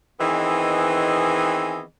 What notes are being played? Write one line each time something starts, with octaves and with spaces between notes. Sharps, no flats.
D#3 E3 B3 C4 G#4 D#5